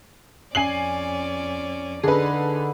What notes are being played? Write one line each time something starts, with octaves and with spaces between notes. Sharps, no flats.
F2 C#4 D5 G#5 C7 F#7
D3 D#4 G#4 B4